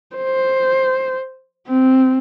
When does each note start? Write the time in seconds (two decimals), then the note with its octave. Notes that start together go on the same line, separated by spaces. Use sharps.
0.16 C5
1.68 C4